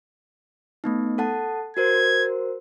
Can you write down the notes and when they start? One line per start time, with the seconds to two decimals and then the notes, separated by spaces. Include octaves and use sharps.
0.84 A3 B3 D#4
1.18 A4 F#5 A5
1.77 F#4 A#4 C5 G#6